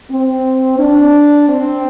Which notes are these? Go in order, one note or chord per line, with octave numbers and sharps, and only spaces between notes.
C4
D4
C4